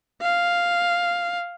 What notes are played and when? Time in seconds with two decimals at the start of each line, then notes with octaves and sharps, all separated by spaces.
0.22 F5